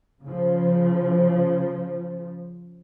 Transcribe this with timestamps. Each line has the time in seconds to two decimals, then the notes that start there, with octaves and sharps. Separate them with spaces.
0.22 C#3 F3